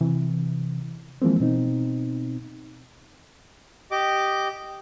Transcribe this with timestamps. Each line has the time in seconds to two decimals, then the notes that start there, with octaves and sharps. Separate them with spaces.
0.01 C3 E3
1.22 E3 F3 G#3 A#3 C4
1.40 B2 C4 D#4
3.91 G4 D#5 D6